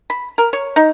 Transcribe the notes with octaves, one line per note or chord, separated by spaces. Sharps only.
B5
A#4
C#5
D#4